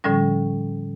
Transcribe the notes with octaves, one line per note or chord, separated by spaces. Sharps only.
A2 D3 F3 G3 C#4